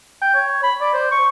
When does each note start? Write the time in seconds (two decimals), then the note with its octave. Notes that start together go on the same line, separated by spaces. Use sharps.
0.22 G5
0.35 C#5
0.63 B5
0.81 D5
0.93 C5
1.12 C#6